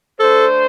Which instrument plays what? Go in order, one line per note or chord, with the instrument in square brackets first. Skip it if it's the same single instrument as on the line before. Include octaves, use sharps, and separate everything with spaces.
[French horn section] A3 D4 C5 [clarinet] A4